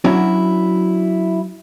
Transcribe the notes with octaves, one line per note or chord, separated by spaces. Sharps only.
F#3 C#4 D4 E4 F#4